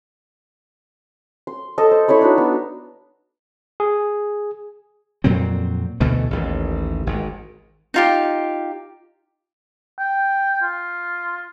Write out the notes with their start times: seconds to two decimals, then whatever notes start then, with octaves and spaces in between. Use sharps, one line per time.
1.47 C6
1.78 A4 D#5 A5
1.91 C5
2.08 E4 A4 C#5 B5
2.21 D4 D#4 F#4
2.38 B3
3.80 G#4
5.24 F2 A#2 F#3 C4
6.00 D2 B2 E3 A3
6.31 A1 D#2
7.07 G#1 G#2
7.94 D#4 F4 G4
9.98 G5
10.62 F4